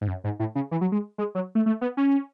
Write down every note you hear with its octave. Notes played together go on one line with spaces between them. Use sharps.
G#2
F#2
G#2
A2
C#3
E3
F#3
G#3
G#3
F#3
A3
A3
B3
C#4